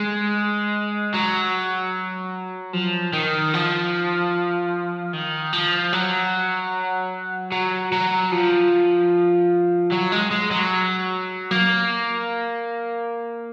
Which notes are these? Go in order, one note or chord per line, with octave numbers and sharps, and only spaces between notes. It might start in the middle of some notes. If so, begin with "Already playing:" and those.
Already playing: G#3
F#3
F3
D#3
F3
D#3
F3
F#3
F#3
F#3
F3
F#3
G#3
G#3
F#3
A#3